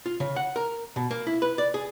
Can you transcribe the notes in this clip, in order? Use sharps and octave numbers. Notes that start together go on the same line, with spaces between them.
F4
C#3
F#5
A#4
B2
A#3
E4
B4
D5
G#4